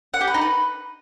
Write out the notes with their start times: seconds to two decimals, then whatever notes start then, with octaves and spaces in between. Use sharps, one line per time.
0.14 F#5
0.21 G4
0.27 B4
0.34 D#4
0.41 B4